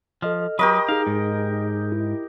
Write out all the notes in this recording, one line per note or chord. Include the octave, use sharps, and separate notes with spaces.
F3 A4 D#5 F6
F#3 G4 A#4 B4 D#5 B5 C#6 D#6
D#4 G#4 F5
G#2
E4